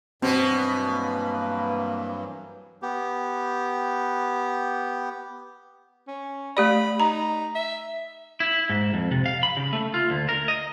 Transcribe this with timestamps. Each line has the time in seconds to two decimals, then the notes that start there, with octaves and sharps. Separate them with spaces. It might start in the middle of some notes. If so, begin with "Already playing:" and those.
0.22 G2 B2 E3 F#3 B3 C4
0.87 A#3 B4
2.82 B3 G4
6.07 C#4
6.57 A3 G4 D5 B5
7.00 D#4 A#5
7.55 E5
8.40 E4
8.69 G#2
8.94 F2
9.11 C3
9.26 F5
9.43 B5
9.57 C#3
9.73 A3
9.94 F4
10.10 D2
10.29 A#4
10.48 D#5